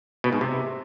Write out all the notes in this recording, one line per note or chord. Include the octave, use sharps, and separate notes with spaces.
B2
G#2
C3